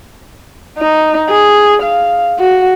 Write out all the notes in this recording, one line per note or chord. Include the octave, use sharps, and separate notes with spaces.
D#4
G#4
F5
F#4